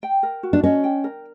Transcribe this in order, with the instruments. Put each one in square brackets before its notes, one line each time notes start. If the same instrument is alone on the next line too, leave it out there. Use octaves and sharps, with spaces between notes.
[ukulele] G5
A#4
F#4
[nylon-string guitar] D4
[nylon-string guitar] C#4 [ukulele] D#5
[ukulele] G5
A#4